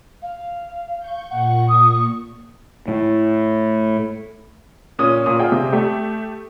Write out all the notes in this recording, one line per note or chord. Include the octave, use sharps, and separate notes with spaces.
F5
C#6 G6
A#2 F#5 C#6
D#6
A2
A#2 C#4 D#6
A#2 D#6
F4 G#4 G5
C3
A3 G4